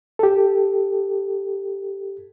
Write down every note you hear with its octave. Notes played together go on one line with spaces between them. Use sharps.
G4 A4